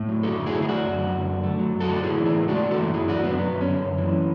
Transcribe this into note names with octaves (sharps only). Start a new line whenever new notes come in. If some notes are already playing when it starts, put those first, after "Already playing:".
Already playing: A2
F#3
F#2 F#4 A4
D3
E4 G#4
A3
G#4
F#3 D4 F#4
F#2
D3
F#2
D3
A3
F#3
F#2
F#4 A4
D3
A2 E4 G#4
E3
E4 G#4
A2
G#3 D4 F#4
A2
F#4 A4
E3
F#2 E4 G#4
D3 D4 F#4
F#2 B3 D4
F#3 B3
F#2
C#4
D3
F#2
E3